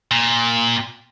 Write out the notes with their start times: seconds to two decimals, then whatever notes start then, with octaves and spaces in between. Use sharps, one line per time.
0.11 A#2